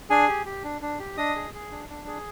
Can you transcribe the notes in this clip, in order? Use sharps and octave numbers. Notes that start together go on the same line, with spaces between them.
D4 G#4 G#5
G4
G4
D4
D4
G4
D4 D#5 D#6
G#4
G#4
D4
D4
G#4